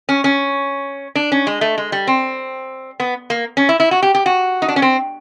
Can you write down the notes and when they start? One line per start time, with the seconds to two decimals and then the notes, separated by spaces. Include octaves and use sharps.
0.09 C#4
0.24 C#4
1.15 D4
1.32 C#4
1.47 G#3
1.61 A3
1.78 G#3
1.92 G3
2.07 C4
3.00 B3
3.30 A#3
3.57 C#4
3.69 E4
3.80 E4
3.91 F#4
4.02 G4
4.15 G4
4.26 F#4
4.62 D#4
4.69 D4
4.76 C#4
4.82 C4